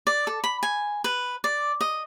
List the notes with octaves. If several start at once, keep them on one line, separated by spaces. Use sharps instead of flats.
D5
A4
B5
G#5
B4
D5
D#5